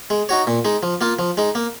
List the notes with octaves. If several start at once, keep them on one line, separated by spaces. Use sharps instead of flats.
G#3
D#4 F#4 C#5
A#2
G#3 D#4
F3
A#3 F4
F3
G#3 D#4
A#3